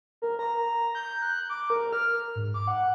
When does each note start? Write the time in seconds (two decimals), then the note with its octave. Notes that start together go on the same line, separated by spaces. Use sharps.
0.22 A#4
0.39 A#5
0.95 G6
1.22 F#6
1.49 D6
1.70 A#4
1.93 F6
2.36 G#2
2.54 D6
2.68 F#5